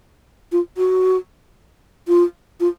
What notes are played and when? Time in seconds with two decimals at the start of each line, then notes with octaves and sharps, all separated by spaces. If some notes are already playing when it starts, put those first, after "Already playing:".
0.52 F4
0.77 F#4
2.08 F4
2.60 F4